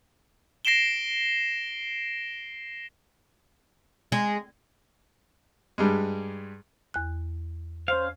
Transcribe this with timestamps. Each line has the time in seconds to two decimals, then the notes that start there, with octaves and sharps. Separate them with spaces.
0.65 A#6 C7 D7 E7 G7
4.12 G#3
5.78 G2 G3 G#3
6.94 E2 F#6
7.88 C#4 C5 F5